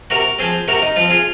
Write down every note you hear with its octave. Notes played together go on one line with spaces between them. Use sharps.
C3 F#4 A#4
F3 C4 G#4 C5
C3 F#4 A#4
D#4
F3 C4 F4
F4 G#4